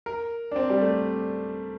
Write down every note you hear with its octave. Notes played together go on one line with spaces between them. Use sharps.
A#4
D4
C4
G3
A3